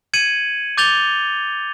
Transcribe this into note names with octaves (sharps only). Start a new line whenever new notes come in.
G#6 C#7 D#7 F#7
D6 G6 A6 F7 G7